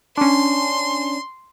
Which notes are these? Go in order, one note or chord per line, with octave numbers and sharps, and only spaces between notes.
C#4 D4 C6